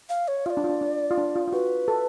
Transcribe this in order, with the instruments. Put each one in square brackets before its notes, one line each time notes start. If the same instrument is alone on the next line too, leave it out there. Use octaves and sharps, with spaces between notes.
[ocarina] F5
C#5
[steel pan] F4 [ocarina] F5
[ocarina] D5
[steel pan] D4
F4
D4
D4
F4
D4
F4
F4
[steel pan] F#4 [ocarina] B4
[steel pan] A4